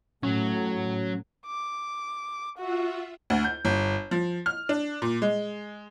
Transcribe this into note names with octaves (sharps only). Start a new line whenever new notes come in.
A2 F#3 C#4
D6
F4 F#4 E5 F#5
D2
G6
G1
F3
F6
D4
A#2
G#3